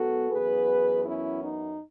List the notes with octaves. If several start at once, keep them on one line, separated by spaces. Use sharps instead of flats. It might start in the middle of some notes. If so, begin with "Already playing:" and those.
Already playing: G#2 F#3 B3 F#4 A4
F#2 E3 B3 G#4 B4
C#4 E4
D#4